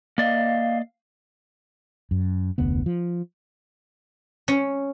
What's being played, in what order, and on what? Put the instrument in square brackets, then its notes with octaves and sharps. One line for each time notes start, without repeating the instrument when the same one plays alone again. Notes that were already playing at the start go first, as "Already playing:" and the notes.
[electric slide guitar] A#3 D5 D#5 [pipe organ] F5
[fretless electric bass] F#2
F1 D2 B3
F3
[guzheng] C#4